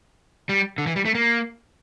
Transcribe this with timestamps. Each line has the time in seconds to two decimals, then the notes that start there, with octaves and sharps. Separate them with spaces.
0.49 G3
0.78 D3
0.87 E3
0.96 G3
1.05 A3
1.15 A#3